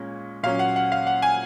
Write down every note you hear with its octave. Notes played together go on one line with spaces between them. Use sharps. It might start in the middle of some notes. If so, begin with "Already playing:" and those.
Already playing: A#2 G#3 C#4
A#2 F#3 C#4 F5
F#5
F#5
F5
F#5
G#5